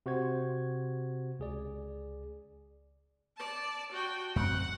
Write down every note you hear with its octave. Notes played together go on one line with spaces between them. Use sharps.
C3 F#4 C5 G#6
C#2 G#4 D5
D5 A5
F#4 G5
F#2 B3 C4 F#5